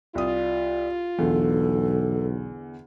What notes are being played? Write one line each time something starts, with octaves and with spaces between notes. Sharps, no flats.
C2 F4 D5 D#6
B1 E2 D3 A4